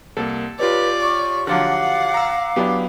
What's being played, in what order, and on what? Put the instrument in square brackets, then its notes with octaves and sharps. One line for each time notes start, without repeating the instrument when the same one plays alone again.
[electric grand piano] C2 A#3 [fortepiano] A4
[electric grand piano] F4 G4 C#5 [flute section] B4 [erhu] D5
[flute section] C#6 [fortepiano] D6
[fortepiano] D3 F3 F#3 [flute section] F5 D6 [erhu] F#5
[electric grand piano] A#5 E6
[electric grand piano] F#3 B3 [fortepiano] D4 E4 G4